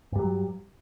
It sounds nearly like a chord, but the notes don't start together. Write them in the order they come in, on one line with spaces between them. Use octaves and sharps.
G2 G3 F#3